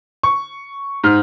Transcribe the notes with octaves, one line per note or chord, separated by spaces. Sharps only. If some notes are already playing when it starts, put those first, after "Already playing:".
C#6
G#2 F6